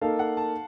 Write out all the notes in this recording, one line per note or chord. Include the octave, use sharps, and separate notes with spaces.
A#3 D#4 A4 F5
F#5
A5